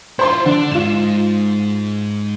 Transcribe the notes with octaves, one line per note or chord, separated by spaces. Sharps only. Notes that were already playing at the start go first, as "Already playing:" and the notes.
E4 F4 C5 C6
D3 D4
G#2 F4 E7